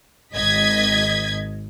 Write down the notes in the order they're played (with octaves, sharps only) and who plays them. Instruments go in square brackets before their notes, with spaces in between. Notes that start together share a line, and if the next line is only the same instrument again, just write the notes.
[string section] G#1 D#5 G#6 B6